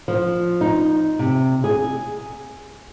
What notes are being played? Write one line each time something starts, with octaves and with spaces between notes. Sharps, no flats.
F3
D#4
C3
G#4